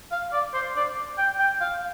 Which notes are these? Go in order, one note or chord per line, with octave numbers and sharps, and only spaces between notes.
F5
D5
C5
D5
G5
G5
F5